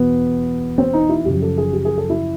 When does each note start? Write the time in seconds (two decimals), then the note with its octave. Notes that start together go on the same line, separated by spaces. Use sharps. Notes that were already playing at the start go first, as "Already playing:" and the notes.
Already playing: E2 B2 B3
0.78 C4
0.93 D#4
1.09 E4
1.25 F#2 C#3 F3 G4
1.42 A4
1.58 G#4
1.73 G4
1.85 G#4
1.97 A4
2.10 E4